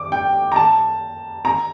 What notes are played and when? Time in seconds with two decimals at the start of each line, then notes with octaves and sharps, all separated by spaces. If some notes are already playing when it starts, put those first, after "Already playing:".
Already playing: D6
0.12 G5
0.52 A#5
0.56 A5
1.45 A#5